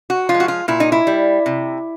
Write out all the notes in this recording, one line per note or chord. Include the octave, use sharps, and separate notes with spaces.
F#4
F3 F4
G#3
F#4
F4
A#2 E4
D#4
E4
G3
C3